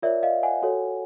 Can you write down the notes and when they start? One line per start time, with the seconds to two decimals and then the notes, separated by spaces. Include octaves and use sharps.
0.02 F4 A#4 C#5 D5 E5
0.23 D#5 F5
0.43 F#5 G#5
0.62 F#4 A4 C#5